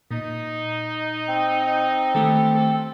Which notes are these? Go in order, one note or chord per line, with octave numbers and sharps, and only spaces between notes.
A#2 D#4
C4
D#3 E3 A3 G4 A4
C3 A4